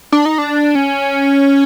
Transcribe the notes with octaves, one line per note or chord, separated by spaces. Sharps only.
D4
D#4
D4
C#4